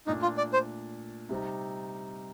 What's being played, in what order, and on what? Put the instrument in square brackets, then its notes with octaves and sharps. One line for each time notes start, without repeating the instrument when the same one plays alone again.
[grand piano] A#2 A3 D4 [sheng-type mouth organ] D#4
[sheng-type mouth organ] F4
D5
C5
[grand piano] C3 G3 C4 D#4